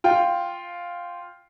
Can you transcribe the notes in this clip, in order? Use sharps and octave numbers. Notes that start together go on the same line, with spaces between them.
F4 G5